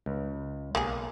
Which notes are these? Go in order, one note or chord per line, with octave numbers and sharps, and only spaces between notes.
C#2
B1 A#3 G4 G#4